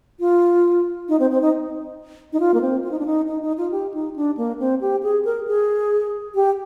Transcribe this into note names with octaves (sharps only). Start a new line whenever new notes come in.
F4
D#4
C4
C4
D#4
D#4
F4
A#3
C4
F4
D#4
D4
D#4
D#4
D#4
F4
G4
D#4
D4
A#3
C4
G4
G#4
A#4
G#4
G4